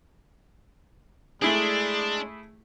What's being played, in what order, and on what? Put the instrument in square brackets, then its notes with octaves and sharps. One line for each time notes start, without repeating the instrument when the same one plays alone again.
[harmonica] G#3 [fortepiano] A3 E4 G#4 [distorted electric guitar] D4